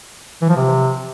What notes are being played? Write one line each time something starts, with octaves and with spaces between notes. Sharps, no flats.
E3
F3
C3